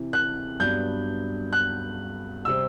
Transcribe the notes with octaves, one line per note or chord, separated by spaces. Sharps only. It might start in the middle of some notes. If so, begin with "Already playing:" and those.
Already playing: C3 E3
F#6
G2 F#3 B3 D4 G6
F#6
C3 G3 C4 E6